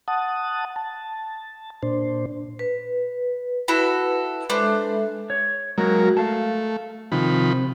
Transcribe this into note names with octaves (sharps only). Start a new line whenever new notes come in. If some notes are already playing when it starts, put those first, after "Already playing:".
F#5 A5 D#6
A5
A#2 D4 C5
B4
E4 F#4 A4 B4
G#3 D4 A4 B4 C5 E5
C#5
F#3 G#3 A#3 F#4 A#4
A3 F5 A5
C3 D#3 F3 B5